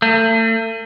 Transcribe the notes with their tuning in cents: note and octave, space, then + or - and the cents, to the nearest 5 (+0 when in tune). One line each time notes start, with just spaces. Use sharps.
A3 +40